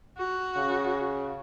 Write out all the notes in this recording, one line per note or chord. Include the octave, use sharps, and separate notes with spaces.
F#4
C#3